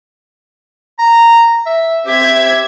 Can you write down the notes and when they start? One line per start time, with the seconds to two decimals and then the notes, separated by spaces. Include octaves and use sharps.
0.99 A#5
1.66 E5
2.06 C4 G4 E5 G#6